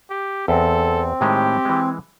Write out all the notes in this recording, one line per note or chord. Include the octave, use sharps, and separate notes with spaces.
G4
E2 C4 A4
A2 D#3 G#3 G4
E3 G#3